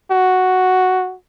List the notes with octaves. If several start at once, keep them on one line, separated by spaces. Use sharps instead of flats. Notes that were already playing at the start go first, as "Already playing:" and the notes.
F#4